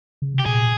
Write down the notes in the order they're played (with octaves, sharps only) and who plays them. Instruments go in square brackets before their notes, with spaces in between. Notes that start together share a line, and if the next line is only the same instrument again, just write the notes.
[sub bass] C#3
C3
[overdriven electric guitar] G4
[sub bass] A#2 [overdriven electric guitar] G#4